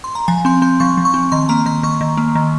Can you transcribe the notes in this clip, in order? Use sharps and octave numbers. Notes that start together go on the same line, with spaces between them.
C6
A#5
F3 G#5
C4 C6
C4 C6
F3 C#6
F3
C#6
C4
D#3 C6
A#3 A#5
D#3 C6
D#3 C#6
D#3
A#3
D#3